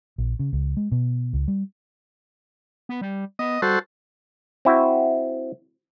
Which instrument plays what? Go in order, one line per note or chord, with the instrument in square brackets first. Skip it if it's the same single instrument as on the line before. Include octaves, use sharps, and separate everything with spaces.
[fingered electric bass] A#1
C#3
C#2
G#3
B2
C#2
G3
[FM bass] B3
G3
[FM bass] B3 [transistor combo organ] D#5
[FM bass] G3 [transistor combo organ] F#4 A4 C5
[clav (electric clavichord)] C4 E4 F#4